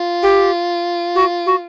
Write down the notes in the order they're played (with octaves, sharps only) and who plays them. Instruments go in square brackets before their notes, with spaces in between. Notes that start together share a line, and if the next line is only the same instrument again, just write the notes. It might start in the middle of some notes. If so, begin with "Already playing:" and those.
Already playing: [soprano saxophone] F4
[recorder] G4
F#4
F#4